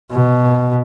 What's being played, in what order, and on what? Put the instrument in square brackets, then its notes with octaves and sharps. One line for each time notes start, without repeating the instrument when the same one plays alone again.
[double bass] B2